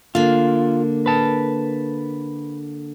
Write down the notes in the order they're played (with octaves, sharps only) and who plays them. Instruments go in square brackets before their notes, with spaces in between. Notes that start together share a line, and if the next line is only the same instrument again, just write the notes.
[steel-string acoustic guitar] D3 A#3 [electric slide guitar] F4
[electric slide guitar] B4 A5